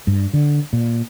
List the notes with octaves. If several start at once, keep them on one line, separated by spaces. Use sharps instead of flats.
G2
D3
A#2